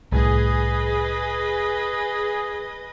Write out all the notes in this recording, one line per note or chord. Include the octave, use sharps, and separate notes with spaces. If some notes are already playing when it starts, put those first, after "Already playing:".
C2 A2 G#4 B4 D#5